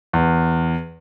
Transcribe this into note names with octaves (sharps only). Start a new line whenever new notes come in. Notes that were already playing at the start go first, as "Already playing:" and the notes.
E2